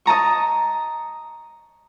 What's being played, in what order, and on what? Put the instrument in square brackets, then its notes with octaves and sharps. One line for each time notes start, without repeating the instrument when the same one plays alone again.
[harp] D#5 A5 A#5 C#6